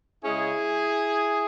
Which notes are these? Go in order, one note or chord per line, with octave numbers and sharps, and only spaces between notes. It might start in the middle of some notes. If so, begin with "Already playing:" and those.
C#3 G#3 C#4 E4 G#4